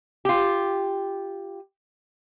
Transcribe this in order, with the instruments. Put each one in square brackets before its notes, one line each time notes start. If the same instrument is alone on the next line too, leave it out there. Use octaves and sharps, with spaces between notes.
[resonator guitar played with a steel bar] F4 G4